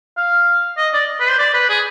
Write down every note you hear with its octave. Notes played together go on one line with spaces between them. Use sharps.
F5
D#5
D5
B4
C5
D5
B4
G#4